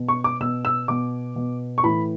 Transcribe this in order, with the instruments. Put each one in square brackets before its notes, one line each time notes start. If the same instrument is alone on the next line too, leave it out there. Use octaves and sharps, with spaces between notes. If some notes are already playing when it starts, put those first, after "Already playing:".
Already playing: [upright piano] B2
C#6
D6
B2 E6
E6
B2 D6
B2
C#6
A2 E3 B5